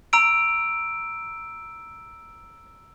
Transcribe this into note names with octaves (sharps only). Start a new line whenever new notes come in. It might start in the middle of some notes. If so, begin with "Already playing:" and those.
A#5 E6 D7